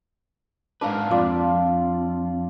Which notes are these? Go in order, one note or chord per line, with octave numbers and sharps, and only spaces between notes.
G#2 D4 A#4 B4 F5
F2 F4 D5